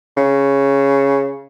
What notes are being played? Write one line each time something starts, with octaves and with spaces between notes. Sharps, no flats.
C#3